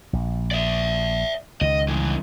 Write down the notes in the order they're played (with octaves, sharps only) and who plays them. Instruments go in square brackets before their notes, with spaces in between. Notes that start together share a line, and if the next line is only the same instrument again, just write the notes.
[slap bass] A#1
[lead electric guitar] D5 E5
[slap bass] C#2 D#3 [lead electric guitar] D#5
[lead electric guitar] G2 E3